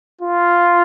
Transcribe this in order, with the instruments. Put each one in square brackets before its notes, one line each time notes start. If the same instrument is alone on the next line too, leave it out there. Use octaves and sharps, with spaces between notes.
[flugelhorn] F4